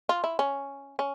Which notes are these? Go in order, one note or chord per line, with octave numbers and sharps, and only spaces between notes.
F4
E4
C#4
C#4